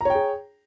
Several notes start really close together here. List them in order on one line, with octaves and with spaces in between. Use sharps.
A#5 C#5 G5 G#4